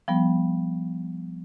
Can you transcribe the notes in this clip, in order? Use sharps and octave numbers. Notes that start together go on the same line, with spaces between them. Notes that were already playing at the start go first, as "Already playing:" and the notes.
F3 G3 B3